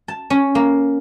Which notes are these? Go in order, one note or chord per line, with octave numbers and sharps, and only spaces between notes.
A5
C#4
A#3